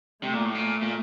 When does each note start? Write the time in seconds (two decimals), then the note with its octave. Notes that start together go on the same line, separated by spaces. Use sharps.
0.23 C3 A3
0.34 A#2
0.45 A2
0.55 A#2
0.82 A#2